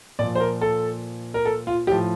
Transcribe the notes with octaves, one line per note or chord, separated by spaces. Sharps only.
A#2 F3 D5
C5
A#4
A4
A#4
A4
F4
A2 F3 G4